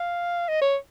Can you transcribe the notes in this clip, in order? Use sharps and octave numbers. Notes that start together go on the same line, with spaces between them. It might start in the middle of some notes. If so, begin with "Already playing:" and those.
Already playing: F5
D#5
C#5